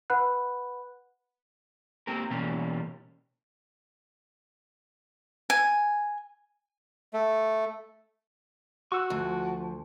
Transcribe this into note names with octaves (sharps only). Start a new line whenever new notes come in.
B4 F#5 B5 F#6
A#3 C4 G4 A#4
B2 E3 G3 A#3 C#4
G#5
A3
F#4 C#6 E6 F#6
D2 F3